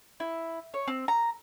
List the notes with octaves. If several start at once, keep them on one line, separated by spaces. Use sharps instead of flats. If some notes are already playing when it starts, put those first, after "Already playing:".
E4
C#5
C4
A#5